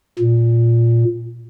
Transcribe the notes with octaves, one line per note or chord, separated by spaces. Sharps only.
A#2